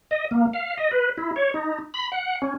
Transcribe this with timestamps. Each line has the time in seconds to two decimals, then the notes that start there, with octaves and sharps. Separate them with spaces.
0.11 D#5
0.31 A#3
0.53 F5
0.78 D#5
0.91 B4
1.17 E4
1.36 C#5
1.54 D#4
1.94 B5
2.12 F#5
2.42 C#4